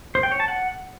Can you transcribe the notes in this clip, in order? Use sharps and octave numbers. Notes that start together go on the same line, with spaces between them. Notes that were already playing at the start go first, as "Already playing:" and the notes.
C5
G5
C#5
A5
F#5